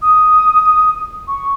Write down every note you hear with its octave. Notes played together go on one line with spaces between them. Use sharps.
D#6
C#6